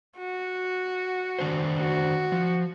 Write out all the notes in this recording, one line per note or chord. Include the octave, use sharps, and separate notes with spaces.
F#4
D#3 D4 C5
F#4
F3